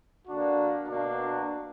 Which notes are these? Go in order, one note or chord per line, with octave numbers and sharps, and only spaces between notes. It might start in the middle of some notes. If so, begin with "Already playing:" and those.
D3 A#3 D4 F#4
B2 A#3 D4 F#4